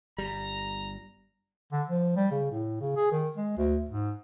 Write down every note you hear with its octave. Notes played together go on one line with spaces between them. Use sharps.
G1 G3 A#5
D3
F3
G3
C#3
A2
C#3
G#4
D#3
G#3
D2
G#2